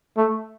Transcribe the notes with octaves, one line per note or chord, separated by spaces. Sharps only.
A3